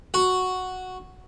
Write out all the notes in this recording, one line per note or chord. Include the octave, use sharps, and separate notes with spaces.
F#4